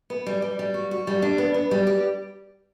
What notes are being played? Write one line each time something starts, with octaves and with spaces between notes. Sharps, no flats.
B3
G3
G3
G3
F#4
F#4
G3
D4
B3
B3
G3
G4